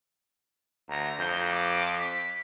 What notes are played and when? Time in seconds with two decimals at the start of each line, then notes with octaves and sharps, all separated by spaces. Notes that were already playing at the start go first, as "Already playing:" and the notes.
0.89 D2 A#5
1.19 F2 G6
1.52 D6
2.00 B6